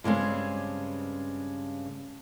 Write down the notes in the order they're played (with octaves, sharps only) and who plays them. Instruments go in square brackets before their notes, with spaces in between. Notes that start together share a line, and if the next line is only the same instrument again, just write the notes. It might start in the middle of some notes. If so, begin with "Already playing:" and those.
[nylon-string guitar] G2 C#3 G#3 C4